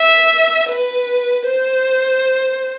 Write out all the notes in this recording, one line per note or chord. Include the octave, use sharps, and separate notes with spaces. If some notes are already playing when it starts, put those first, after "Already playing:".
Already playing: E5
B4
C5